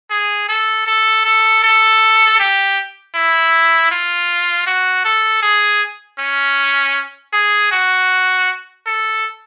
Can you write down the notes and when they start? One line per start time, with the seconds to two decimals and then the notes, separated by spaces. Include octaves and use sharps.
0.10 G#4
0.49 A4
0.87 A4
1.25 A4
1.63 A4
2.40 G4
3.15 E4
3.91 F4
4.67 F#4
5.05 A4
5.43 G#4
6.19 C#4
7.33 G#4
7.72 F#4
8.86 A4